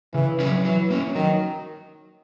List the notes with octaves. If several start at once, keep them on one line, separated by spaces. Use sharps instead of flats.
C#3 E3
F#3 C#4 E4 B4
E3 F#3
A#3 C#4
D#3 F#3